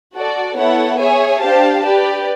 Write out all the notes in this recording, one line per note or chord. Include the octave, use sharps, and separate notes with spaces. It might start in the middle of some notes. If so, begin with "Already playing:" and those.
F#4 A4 D5
B3 E4 A4 C#5 F#5
G#4 C#5 E5 G#5
D4 G4 C5 F5 A5
G4 B4 D5